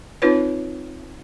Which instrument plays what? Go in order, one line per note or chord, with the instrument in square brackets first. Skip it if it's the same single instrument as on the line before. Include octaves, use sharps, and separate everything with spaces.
[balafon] C4 D#4 F4 B4 C#5